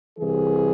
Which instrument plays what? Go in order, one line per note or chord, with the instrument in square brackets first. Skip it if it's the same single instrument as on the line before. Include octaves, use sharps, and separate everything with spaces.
[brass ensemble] C2 C3 E3 G#4